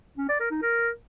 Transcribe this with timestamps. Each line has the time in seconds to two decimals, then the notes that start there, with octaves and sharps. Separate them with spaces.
0.18 C#4
0.29 D5
0.40 A#4
0.51 D#4
0.62 A#4